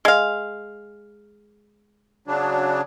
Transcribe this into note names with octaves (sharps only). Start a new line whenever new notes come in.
G#3 F5
C#3 F#3 D4